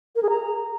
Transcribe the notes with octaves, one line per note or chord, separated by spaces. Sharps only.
A#4
G#4
A#5